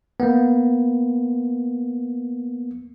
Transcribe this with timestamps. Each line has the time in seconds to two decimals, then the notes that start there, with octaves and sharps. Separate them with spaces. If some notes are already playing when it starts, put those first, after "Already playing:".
0.20 A#3 B3